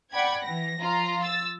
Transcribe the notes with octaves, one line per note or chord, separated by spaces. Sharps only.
D5 F#5 G5 B5 G#6
E3 A#6
F3 F4 A#5
E6 A6